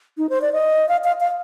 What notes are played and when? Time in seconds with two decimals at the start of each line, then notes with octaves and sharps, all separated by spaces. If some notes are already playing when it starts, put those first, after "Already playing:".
0.18 D#4
0.30 C5
0.42 D5
0.53 D#5
0.89 F5
1.04 F5
1.20 F5